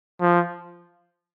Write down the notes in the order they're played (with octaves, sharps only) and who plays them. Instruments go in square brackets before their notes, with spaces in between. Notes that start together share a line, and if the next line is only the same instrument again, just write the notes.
[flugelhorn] F3